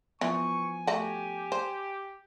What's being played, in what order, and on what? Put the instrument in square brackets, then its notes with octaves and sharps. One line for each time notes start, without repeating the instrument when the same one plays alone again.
[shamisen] E3 [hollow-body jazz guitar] F3 B3 [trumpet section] G#5 [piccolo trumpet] C#6
[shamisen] A3 F#4 [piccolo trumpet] G4
[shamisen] C5